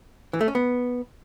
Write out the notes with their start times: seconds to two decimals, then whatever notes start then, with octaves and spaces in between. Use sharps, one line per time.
0.33 E3
0.41 A3
0.48 C#4
0.55 B3